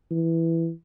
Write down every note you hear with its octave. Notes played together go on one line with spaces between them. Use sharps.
E3